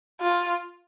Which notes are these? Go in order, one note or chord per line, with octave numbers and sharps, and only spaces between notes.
F4